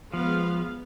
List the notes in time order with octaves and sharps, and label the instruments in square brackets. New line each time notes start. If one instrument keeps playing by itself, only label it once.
[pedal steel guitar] F3 [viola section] G#3 B3 F5